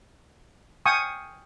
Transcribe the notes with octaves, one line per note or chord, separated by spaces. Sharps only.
F5 G5 G#5 C#6 D#6